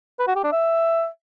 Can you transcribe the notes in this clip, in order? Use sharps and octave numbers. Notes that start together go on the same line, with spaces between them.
B4
F#4
G4
D4
E5